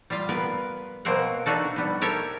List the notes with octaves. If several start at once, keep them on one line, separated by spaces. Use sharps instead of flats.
G3 F4
B3 A#4 B4
B2 A#3 C4 A#4 F#5
D4 D#4 F#4 A4
G3 B3
G4 A4 A#4 C#5 E5